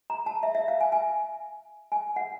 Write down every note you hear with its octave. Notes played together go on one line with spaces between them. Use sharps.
A#5
A5
E5
E5
F5
G#5
G#5
G#5
F#5